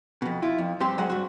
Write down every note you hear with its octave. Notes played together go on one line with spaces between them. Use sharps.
F2 B2
E4 F4
F2
G2 C4 G4 C6
F#3 G#3 C5 F#5
G2 F#4